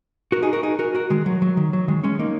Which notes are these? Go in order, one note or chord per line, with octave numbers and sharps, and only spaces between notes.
F#4 A#4
D#4 G#4
F#4 A#4
D#4 G#4
F#4 A#4
F#4 A#4
D#3 G#3
F#3
F#3
D#3
F#3
D#3 G#3
G#3 C#4
A#3 D#4